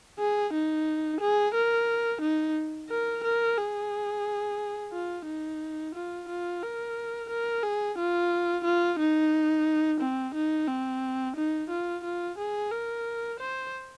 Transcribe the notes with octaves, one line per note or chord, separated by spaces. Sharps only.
G#4
D#4
G#4
A#4
D#4
A#4
A#4
G#4
F4
D#4
F4
F4
A#4
A#4
G#4
F4
F4
D#4
C4
D#4
C4
D#4
F4
F4
G#4
A#4
C5